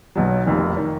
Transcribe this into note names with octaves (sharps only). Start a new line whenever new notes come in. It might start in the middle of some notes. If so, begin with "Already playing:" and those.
B1 B2 F#3
F1 F2 D#3
D#3